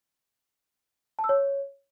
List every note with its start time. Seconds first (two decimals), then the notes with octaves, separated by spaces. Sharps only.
1.19 A5
1.24 E6
1.29 C#5